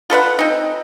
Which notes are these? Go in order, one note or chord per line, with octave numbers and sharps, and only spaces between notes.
F4 A4 B4 F#5
C4 D#4